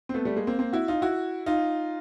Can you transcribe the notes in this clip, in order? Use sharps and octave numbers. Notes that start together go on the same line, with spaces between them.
C4
A3 B3
G3 A3
G#3 A#3
A#3 C4
A#3 C4
E4 F#4
D#4 F4
E4 F#4
D#4 F4